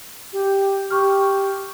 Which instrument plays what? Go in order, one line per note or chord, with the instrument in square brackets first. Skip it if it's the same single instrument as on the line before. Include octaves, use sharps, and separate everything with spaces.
[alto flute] G4
[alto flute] G4 [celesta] C#6 F6